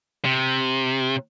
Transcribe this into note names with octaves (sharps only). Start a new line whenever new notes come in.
C3